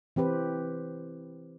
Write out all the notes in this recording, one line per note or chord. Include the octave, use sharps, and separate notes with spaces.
E3 C4 G4 B4